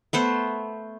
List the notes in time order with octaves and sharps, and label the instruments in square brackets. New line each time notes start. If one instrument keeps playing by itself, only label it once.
[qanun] A3 B3 C5